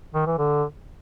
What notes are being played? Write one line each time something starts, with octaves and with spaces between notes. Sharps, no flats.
D#3
E3
D3